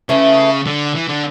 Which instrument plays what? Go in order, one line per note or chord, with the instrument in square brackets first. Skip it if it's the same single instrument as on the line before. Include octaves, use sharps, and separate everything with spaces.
[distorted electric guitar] C#3 [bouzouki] E3 A3 E4
[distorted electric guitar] D3
E3
D3